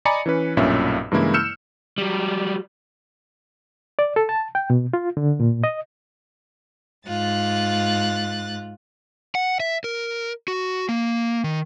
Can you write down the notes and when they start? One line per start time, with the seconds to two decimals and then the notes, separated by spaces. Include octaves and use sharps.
0.05 D5 D#5 G#5 A#5 B5 C#7
0.26 E3 C#4 B4
0.57 B1 G2 A#2 C#4 E5 E6
1.11 G2 C#3 E3 G#3 A#3 E4
1.34 E6 F6 G6 C#7 E7
1.98 F#3 G3
3.99 D5
4.16 A4
4.29 A5
4.55 G5
4.70 B2
4.93 F4
5.17 D3
5.40 A#2
5.64 D#5
7.08 G#2 F4 F#6 A6
9.35 F#5
9.60 E5
9.84 A#4
10.48 F#4
10.89 A#3
11.44 D#3